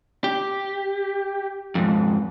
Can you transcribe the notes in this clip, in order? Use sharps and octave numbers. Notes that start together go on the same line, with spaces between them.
G4
F2 G#2